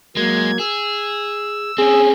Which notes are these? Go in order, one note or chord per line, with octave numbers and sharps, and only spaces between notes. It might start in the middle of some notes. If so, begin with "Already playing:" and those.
F#3 G#3 A#3 G#6
G#4 E6
C4 C#4 G#4